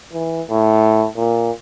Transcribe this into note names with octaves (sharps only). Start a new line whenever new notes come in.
E3
A2
A#2